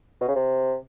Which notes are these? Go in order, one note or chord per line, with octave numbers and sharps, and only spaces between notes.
B2
C#3
C3